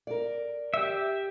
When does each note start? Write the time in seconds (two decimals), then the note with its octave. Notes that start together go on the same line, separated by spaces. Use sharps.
0.07 A#4 D5
0.74 G4 E5